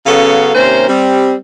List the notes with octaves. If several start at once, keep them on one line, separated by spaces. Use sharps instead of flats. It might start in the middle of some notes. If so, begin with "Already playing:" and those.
C#3 F#3 B3 C#4 A4 F5
D#2 C3 C#4 A#4 C5
G3 C4